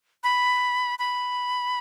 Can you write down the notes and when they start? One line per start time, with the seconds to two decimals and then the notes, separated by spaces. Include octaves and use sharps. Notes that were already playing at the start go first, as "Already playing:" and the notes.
0.24 B5
0.99 B5